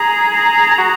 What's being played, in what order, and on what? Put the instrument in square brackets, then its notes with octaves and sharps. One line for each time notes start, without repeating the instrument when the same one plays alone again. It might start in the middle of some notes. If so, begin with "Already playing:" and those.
Already playing: [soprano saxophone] G#4 [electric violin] A#5
[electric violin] A#5
[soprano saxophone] F#4